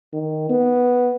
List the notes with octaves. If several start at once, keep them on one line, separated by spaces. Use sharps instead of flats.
D#3
B3